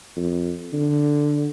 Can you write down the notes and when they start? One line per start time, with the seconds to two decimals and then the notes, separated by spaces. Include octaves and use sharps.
0.16 F2
0.73 D3